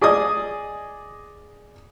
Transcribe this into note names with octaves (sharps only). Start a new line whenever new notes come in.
G#4 D5 D#5 G#5 D#6